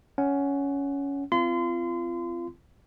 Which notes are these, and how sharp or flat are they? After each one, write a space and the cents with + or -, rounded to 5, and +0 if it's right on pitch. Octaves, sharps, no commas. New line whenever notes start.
C#4 +15 F#5 +15
C4 -25 F4 -30 C6 -35